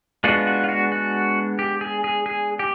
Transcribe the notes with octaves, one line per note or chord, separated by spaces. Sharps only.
G#3 B3 D4 F4 F#4
F#4
F4
F#4
F#4
G4
G#4
G#4
G#4
G4